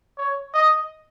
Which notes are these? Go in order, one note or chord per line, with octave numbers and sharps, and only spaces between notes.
C#5
D#5